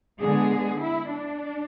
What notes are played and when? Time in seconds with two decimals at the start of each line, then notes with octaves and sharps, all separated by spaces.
0.19 D3 G#3 B3 G#4
0.80 E4
1.10 D4